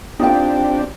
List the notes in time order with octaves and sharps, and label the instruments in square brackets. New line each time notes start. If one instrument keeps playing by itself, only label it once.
[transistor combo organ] C4 D4 G4 [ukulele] D#4 F4 G5